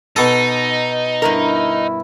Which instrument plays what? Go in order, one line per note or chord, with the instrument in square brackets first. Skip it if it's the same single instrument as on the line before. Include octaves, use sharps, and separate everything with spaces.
[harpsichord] B2 A4 [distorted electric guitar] D#4
[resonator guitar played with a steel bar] G2 D#3 A#4 [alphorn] E4